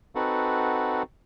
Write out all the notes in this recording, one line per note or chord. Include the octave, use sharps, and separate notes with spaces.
C4 D#4 F#4 A4 B4 F#5